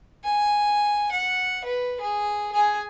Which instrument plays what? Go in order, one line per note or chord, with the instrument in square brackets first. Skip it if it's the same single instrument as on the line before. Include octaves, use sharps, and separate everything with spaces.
[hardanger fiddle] G#5
F#5
B4
G#4
G#4 G#5